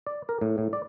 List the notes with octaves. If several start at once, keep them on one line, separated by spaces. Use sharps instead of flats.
D5
A#4
A2
A2
D5